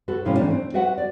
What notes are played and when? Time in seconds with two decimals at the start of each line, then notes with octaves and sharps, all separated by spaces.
0.08 F#4 A4 B4
0.25 G#2 C3 F3 C#4 E4 F4
0.37 E3 A3 C#4 D4
0.50 C4
0.74 F#4 B4 E5 F#5
0.98 D5